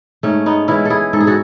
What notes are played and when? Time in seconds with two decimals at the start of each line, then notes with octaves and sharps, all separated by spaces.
0.23 G#2 A3 C#4
0.46 B3 D#4
0.68 E3 G#3 C#4 E4
0.85 A4
0.90 E4 G#4
1.13 G#2 A4
1.20 G#4
1.27 F#4 A4